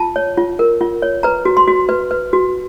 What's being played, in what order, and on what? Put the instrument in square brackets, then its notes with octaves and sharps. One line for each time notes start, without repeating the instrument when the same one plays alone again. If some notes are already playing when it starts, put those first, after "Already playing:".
Already playing: [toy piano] F4 A5
C#5
F4
A#4
F4
C#5
B4 A#5
F#4
C6
F#4
B4
B4
F#4